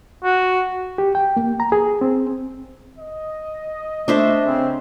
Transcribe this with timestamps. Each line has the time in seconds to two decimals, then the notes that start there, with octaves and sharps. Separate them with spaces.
0.24 F#4
0.98 G4
1.15 G5
1.37 A#3
1.60 A#5
1.72 G#4
2.01 C4
2.99 D#5
4.08 A3 D4 C5 E5
4.46 C#3 C4